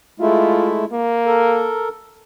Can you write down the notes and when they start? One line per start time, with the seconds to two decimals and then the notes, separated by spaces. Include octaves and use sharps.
0.20 G#3 A3 E4 F4
0.92 A#3
1.26 A4 A#4